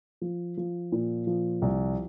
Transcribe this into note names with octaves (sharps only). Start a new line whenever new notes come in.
F3
F3
A#2
F3
C2